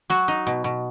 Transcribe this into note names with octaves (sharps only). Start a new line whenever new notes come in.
F#3 F#4
D#4
B2
B2